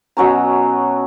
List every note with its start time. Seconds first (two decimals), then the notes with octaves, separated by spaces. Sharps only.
0.17 B2 F#3 C#4 A#5